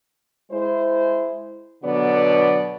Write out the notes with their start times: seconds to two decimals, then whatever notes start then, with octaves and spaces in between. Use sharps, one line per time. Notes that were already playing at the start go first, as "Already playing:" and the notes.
0.51 G#3 E4 C5
1.84 B2 D3 F#3 B3 F#4 D5